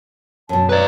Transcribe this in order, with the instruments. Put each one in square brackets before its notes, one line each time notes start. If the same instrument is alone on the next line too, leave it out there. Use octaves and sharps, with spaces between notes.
[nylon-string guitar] F#2 B2 [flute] A5
[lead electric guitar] B4 D5 [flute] A#5